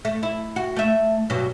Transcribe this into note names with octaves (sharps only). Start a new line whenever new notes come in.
A3
E4
F#4
A3 E5
G2 B2 F#3